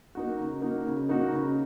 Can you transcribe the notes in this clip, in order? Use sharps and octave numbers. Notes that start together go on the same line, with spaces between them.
A#3 D#4 F#4
C#3
A#3 D#4 F#4
C#3
A#3 D#4 F#4
C#3